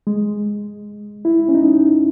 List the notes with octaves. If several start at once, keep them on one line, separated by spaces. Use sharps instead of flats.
G#3
E4
C#4
D#4